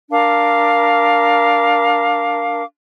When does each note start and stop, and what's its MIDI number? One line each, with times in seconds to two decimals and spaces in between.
0.11 2.63 62
0.11 2.63 70
0.11 2.63 77
0.11 2.63 86